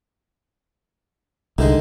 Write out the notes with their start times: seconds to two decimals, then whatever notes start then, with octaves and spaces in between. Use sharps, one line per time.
1.58 C2 D3 D#3 G#3